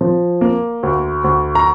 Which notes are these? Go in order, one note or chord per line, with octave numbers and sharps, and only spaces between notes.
F3
A#3
D2
D2
A#5